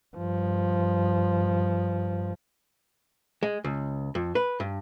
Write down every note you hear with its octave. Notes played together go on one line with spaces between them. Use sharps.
G2 F3
G#3
C#2
F2
B4
G2